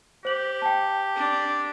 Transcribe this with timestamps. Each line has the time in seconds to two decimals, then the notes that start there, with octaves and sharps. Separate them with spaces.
0.25 G4 C5 F#7
0.62 G5 A5
1.16 D4